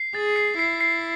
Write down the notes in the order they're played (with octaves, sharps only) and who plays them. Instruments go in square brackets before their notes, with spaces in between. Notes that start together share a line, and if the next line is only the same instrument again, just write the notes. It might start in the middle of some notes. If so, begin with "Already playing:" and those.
Already playing: [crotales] C7
[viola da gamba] G#4 [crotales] A6
[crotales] C7
[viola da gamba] E4 [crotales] C7
[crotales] C7